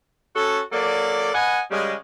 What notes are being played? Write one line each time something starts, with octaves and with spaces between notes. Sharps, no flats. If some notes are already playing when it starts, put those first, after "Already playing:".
C#4 F#4 A4
F#3 A#3 A4 D5
B4 D#5 F#5 G#5
F#2 C#3 G3 G#3